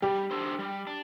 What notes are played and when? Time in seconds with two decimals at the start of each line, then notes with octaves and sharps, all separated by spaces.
0.02 G3 G4
0.31 D4 A4 C5
0.59 G3
0.87 D4